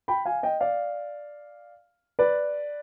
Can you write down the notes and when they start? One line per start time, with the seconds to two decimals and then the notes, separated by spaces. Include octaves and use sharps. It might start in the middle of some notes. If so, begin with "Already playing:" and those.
0.08 G5 B5
0.25 F5 G#5
0.43 D#5 G5
0.60 D5 F5
2.19 B4 D5